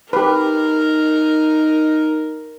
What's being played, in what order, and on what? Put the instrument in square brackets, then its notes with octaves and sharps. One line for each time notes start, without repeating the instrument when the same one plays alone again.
[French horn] D#4 [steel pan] G4 B4 [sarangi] A#4